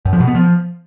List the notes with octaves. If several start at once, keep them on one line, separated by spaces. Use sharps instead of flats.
F#2
F3
B2
B3
F3